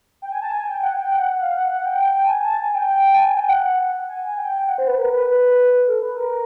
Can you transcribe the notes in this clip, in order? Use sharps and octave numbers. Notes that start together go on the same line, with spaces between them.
G5
G#5
A5
G#5
G5
F#5
G5
F#5
F5
F#5
F#5
G5
A5
G#5
A5
G#5
G5
A5
G#5
G5
F#5
G#5
G#5
G5
F#5
C5
B4
A#4
B4
B4
A4
B4
A#4